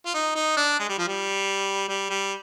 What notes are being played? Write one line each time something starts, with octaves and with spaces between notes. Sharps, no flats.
F4
D#4
D#4
D4
G#3
G3
F3
G3
G3
G3